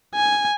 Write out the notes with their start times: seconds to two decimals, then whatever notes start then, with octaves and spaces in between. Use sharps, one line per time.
0.15 G#5